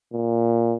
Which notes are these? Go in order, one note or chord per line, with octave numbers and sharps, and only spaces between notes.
A#2